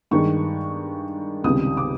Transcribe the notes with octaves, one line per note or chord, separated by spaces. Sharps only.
G2 D#3 G#3 C#6
C#2 C3 D#3 G3 D#6
D6